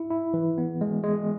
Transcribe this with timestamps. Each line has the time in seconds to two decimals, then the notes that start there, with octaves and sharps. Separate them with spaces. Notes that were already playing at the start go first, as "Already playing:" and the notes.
Already playing: E4
0.11 E4
0.34 E3
0.58 B3
0.81 G#3
1.03 G#3